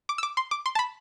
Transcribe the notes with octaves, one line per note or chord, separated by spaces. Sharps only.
D6
E6
D6
C6
D6
C6
A5
B5